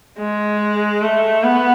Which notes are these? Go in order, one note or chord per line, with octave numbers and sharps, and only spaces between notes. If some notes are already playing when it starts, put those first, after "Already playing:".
G#3
A3
B3